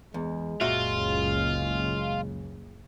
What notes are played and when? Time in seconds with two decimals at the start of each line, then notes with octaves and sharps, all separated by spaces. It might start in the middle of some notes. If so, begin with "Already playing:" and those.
0.14 E2 G#3
0.61 F#1 C#2 A#2 C#3 F4 F#4 E5